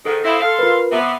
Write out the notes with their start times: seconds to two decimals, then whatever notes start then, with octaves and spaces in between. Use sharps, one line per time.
0.06 G#2 D#3 A4
0.24 C4 E4 F5 D#6
0.41 A4 F5 C6
0.59 F4 A#4 B4
0.91 C3 B3 E5